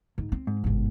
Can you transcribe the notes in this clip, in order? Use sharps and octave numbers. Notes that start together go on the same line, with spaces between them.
G#2
C4
G#2
G1 B2